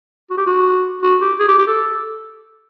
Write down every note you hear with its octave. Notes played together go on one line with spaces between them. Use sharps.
F#4
G4
F#4
F#4
G4
G#4
G4
G4
A4